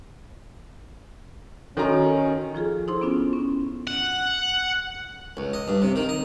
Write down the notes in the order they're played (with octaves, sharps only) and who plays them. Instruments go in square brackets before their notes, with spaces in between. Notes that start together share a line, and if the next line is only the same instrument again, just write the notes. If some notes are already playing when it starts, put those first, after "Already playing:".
[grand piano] D#3 A#5 [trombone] C#4 [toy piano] F#4 A4
[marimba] F3 F4 G#4 A4
D#4 E4 A4 C5 C6
B3 C#4 D4 F4
C#4
[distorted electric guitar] F#5
[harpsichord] C#2
D#5
G2
C3
D#3
D#5